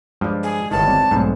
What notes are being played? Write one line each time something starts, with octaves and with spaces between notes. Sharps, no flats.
G2 F3 G#3 D5
G#4
G1 D#3 E4 B4 C#5 A5
G3 C4 D5
B1 G#2 A3 C4